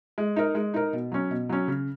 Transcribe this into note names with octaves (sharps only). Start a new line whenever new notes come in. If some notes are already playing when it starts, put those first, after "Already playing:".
G#3
D#4 A#4
G#3
D#4 A#4
B2
F#3 C#4
B2
F#3 C#4
C#3